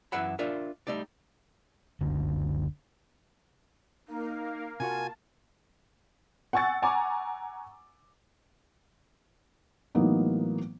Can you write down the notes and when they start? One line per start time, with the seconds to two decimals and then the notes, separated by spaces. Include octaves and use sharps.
0.12 F#2 E3 E5 F#5 B5
0.39 D4 F4 A#4 E5
0.87 G3 A3 D#4 D5
2.01 F#1 C#2 D3
4.08 A#3 D#4 A#4 F5
4.80 C3 F4 F#4 A#4 G#5 A5
6.53 F#5 G#5 C#6 E6 A6 C#7
6.82 F#5 G#5 A#5 C#6 D6
9.95 A2 E3 F#3 A#3 B3 D#4